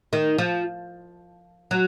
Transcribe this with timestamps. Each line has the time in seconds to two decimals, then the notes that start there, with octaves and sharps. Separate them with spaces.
0.13 D#3
0.38 F3
1.71 F#3